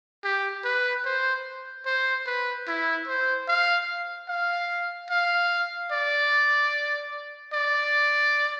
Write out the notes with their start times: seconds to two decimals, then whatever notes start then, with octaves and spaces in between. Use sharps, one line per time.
0.24 G4
0.64 B4
1.05 C5
1.86 C5
2.27 B4
2.67 E4
3.08 C5
3.48 F5
4.29 F5
5.10 F5
5.92 D5
7.53 D5